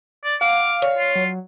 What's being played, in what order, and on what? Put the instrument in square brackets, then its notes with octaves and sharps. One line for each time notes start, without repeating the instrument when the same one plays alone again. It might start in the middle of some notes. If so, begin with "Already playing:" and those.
[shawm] D5
[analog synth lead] F5 [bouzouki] F#5 [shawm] D6
[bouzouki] C#5
[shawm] F4
[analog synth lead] F#3